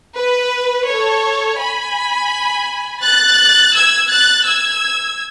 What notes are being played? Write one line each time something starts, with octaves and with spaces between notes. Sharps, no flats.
B4
A4 C#5
G#5 B5
F#6 A6
E6 G#6
F#6 A6
E6 G#6